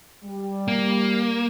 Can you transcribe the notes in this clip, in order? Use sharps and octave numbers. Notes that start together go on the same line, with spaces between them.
G3
A#3